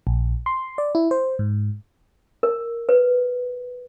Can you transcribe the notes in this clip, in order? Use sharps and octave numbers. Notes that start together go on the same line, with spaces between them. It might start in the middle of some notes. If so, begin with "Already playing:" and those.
A#1
C6
D5
E4
C5
G#2
A#4
B4